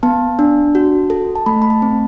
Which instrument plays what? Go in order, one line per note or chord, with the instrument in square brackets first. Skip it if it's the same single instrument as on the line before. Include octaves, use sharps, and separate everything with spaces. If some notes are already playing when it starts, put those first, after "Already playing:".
[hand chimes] B3 A5
D4
F#4
A4
A5
A3 B5
B5
A5
C4